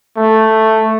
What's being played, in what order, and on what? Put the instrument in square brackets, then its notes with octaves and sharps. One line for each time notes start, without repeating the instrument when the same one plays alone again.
[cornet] A3